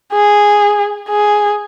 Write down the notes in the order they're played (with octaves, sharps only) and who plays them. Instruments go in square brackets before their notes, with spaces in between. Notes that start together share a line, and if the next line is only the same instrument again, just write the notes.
[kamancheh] G#4
G#4